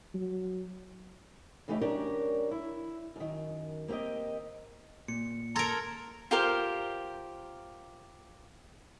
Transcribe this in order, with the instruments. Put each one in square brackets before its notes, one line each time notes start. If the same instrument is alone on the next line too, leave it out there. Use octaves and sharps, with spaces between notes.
[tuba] F#3
[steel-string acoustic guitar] C#3 E3 A3 D#4 G4
F#3 C#4 D4 G4 A#4 D5
E4
F#2 D#3
A#3 C4 E4 G4 D#5
[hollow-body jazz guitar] A#2 [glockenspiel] C#7
[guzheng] A4 A#4 [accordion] A#5 [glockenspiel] C6 G#6
[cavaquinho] F4 G4 A#4 C5